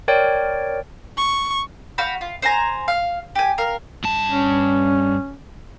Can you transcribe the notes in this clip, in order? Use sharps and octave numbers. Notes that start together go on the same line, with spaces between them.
A#4 C#5 D5 G5
C#6
F#4 F5 G5 B5
F4
C5 E5 G#5 A#5
F5
G4 G#5
A#4 F5
G2 A5
C#4